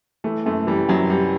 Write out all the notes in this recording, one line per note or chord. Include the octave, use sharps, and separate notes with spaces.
E3 A3
F#2 A3
E3 G3
F#2 F#3
E3 G3